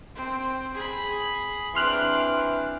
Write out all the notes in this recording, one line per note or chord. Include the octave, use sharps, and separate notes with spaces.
C4
G#4 B5
E3 C4 D4 C6 F6 F#6